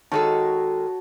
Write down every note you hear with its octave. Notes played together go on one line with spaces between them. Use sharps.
D#3 G#3 F#4 A4 C#5 A5